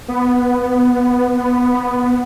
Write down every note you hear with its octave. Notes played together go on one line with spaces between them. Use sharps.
B3